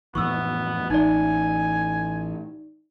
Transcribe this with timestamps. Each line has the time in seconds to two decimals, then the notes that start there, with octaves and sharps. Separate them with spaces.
0.15 F2 A2 E3 B3 C#6 E6
0.90 A1 D#4 D5 G#5